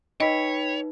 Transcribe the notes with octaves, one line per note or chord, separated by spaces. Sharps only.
D#4 B4 C#5 D#5 G5 B5 B6